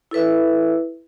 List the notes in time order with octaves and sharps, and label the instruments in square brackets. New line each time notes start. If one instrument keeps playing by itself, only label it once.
[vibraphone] E4 A4 B4 E5